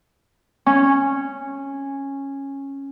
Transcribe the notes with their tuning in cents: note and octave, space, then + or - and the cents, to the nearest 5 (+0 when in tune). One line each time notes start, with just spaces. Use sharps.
C#4 -10